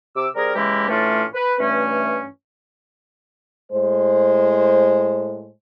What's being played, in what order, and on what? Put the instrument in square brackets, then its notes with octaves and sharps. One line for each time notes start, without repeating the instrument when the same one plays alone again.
[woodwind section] C3 D6 E6
G3 C4 G#4 A#4
C#3 E3 G#3 A#3 E4 G4
A2 E3 A3 C#4 D4 F4
B4
G2 E3 A3 C#4
[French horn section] A2 G#3 C5